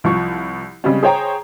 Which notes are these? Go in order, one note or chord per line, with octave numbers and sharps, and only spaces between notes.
C2 F3 C#6
C#3 G3 G#3 C4 C#4
G#4 C5 C#5 G5 A#5